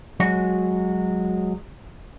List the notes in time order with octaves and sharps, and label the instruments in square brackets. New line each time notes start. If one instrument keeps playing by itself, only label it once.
[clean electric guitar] F#3 G#3 F#4